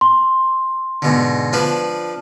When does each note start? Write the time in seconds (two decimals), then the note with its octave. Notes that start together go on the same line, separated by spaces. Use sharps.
0.01 C6
1.02 G#2 B2 D3
1.53 F3 D4 B4